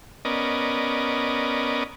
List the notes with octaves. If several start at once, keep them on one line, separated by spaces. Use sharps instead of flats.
B3 C#4 A#4 D5 D#5